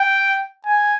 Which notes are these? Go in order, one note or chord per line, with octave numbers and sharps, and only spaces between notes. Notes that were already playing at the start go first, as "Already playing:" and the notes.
Already playing: G5
G#5